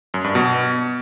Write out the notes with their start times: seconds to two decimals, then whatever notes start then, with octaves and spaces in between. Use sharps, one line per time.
0.14 F#2
0.24 G2
0.35 B2